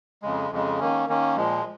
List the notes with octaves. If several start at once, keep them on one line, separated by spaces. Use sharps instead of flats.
F2 C#3 G#3
F2 C#3 G#3
D#3 A#3 C#4
D#3 A#3 C#4
A#2 F3 G#3